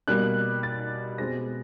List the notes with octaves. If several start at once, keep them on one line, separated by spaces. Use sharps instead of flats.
B2 G3 A#3 F#6
A6
B2 G#3 C4 A#6